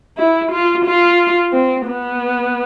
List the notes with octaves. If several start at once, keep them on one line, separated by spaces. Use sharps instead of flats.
E4
F4
F4
C4
B3